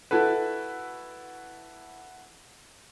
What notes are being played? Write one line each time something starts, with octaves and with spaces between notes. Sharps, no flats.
E4 F#4 A4 B4